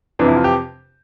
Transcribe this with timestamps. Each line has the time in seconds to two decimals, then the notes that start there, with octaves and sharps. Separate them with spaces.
0.19 F2 C3 E3 D4
0.28 E4
0.36 F4
0.44 G4